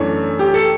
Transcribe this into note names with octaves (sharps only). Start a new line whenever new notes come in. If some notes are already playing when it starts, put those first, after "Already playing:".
Already playing: F#2 E3 A3 D4 C#5
G4
A4